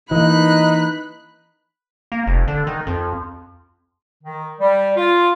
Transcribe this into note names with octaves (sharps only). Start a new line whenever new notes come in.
E3 A#3 D#4 B5 F#6
A#3
F1
D3
D#3
F2
D#3
G3
F4